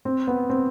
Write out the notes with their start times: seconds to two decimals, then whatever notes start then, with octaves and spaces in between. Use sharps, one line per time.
0.05 C4
0.27 B3
0.50 C4